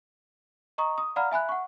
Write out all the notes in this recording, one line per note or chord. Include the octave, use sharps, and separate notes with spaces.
D#5 A#5 C#6 D#6
D#6
D5 F5 F#5 A#5 B5 F6
E5 G#5 B5 F#6
F#5 C#6